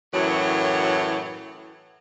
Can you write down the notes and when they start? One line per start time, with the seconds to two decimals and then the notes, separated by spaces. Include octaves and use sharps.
0.14 F#2 A2 E3 F#3